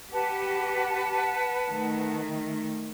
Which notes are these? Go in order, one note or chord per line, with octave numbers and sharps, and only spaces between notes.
G4 B4 F#5 A5
D#3 A3